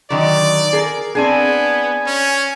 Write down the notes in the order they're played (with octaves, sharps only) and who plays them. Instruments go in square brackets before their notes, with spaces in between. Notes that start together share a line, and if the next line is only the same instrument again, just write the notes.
[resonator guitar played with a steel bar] D3 D#3 F#3 [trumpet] D5
[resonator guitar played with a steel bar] G#4 A#4
[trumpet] B3 [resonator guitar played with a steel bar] C4 D4 G#4 [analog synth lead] G#5
[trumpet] C#4